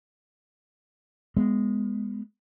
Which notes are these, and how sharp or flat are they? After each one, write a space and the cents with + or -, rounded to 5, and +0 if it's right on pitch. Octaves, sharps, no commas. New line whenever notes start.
G#3 -10 B3 +0